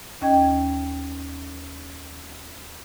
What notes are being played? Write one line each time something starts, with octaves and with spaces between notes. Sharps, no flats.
D#2 C#4 D#5 G5 G#6